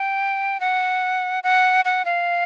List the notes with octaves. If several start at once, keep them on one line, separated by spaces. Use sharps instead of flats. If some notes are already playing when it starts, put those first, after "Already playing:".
Already playing: G5
F#5
F#5
F#5
F5